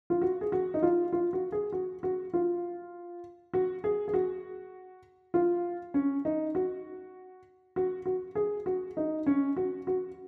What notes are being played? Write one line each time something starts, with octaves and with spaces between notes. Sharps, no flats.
F4
F#4
G#4
F#4
D#4
F4
F4
F#4
G#4
F#4
F#4
F4
F#4
G#4
G#4
F#4
F4
C#4
D#4
F#4
F#4
F#4
G#4
F#4
D#4
C#4
F#4
F#4